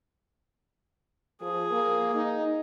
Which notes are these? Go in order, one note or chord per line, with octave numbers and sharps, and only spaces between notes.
F3 G#4
A#3
D#4